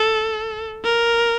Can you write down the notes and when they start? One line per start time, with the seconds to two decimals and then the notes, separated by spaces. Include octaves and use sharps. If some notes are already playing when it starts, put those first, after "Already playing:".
Already playing: A4
0.84 A#4